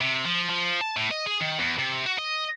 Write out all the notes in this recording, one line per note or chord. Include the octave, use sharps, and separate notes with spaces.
C3
F3
F3
A5
A2
D#5
G#4
D#3
E2
C3
F#4
D#5